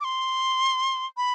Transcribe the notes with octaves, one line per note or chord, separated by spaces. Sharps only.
D6
C6
B5